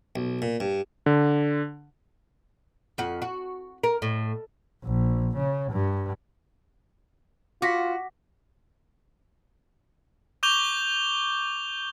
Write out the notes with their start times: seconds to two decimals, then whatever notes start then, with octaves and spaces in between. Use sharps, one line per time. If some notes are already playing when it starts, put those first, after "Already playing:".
0.16 B1
0.42 A#2
0.60 G2
1.06 D3
2.98 F2 F#4
3.22 F#4
3.83 A#4
4.02 A2
4.84 A#1
5.37 C#3
5.72 G2
7.62 F4 F#4 D6 A#6 B6
10.43 C#6 D6 G6 F7 G7